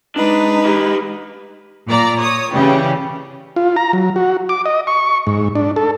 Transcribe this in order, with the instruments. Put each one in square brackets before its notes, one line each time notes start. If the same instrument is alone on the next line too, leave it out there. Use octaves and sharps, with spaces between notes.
[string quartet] G#3 B4 [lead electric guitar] D4 [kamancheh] D#4
[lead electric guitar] G4 D#5
[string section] A#2 D5 A#5
C#5 D#6
C#3 E3 G3
[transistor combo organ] F4
A#5
F#3
F#4
D6
D#5
C#6
G#2
D4
A4